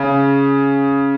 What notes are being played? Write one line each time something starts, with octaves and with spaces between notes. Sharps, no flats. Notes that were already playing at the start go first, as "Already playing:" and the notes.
Already playing: C#3